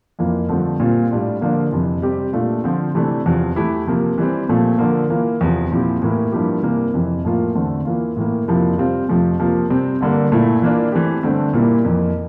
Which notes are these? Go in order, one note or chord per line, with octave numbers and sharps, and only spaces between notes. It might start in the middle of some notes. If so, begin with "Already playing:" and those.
F2 E3 A#3 F4
G2 D3 F3 A3 C4
A#2 G3 C4 F4
A2 G3 D4 F4
D3 F3 A#3 D4 F4
F2 C3 E3
C3 G3 C4 G4
A#2 A3 D4 F4
D3 F3 C4 F4
C3 E3 A3 D4
E2 C3 F3
E3 A3 E4 G4
C3 F3 A#3
E3 G3 C4
A#2 F3 A3 C4
D3 F3 A#3
E3 A#3 F4
E2 C3 F3
A#2 F3 C4 E4 G4
A2 E3 A#3 E4
G2 F3 A#3 E4 G4
C3 E3 G3 A#3
F2 C3 E3
A2 F3 A#3 F4
E2 D3 A3 C4
E3 A#3 F4
A2 E3 A#3
F2 C3 F3 A#3 E4
C3 G3 C4 F4
F2 C3 F3 A3
C3 F3 A#3 F4
C3 G3 C4
G2 D3 G3 A#3
A#2 A3 E4
E3 A#3 D4 F4
E3 A3 C4 G4
G2 D3 A3 C4
A#2 G3 A#3 E4 G4
F2 E3 A#3